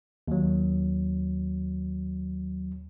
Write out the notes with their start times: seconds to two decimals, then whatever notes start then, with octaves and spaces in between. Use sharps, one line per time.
0.28 D#2 F#3